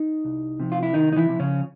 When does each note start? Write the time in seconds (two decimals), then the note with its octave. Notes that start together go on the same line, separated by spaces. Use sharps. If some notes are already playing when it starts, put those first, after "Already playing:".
Already playing: D#4
0.25 C2
0.60 C3 F3
0.72 F4
0.83 E4
0.94 C2 D#3 D#4
1.12 D#4
1.16 E3 E4
1.28 C3 F3
1.40 C#3 C#4